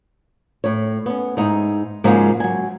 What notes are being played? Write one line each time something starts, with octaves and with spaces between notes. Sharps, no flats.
A2 C#5
B3 C#4
G#2 D#4 E4
G#2 C#3 F3 F#3 G#3 A#3
F#3 G#5